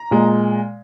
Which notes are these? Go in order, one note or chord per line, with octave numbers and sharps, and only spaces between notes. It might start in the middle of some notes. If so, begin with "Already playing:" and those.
Already playing: A#5
A#2 G#3